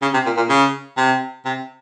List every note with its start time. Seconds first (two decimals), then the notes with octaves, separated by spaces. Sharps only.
0.02 C#3
0.13 C3
0.26 A#2
0.37 A#2
0.49 C#3
0.97 C3
1.45 C3